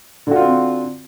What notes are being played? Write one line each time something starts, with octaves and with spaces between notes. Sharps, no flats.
D3 C4 F4 F#4